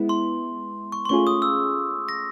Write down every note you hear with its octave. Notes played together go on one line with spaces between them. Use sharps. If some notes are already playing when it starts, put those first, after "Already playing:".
Already playing: G#3 B3 E4
C6
C#6
C6
A3 C#4 F4 G#4 C#6
D#6
E6
A#6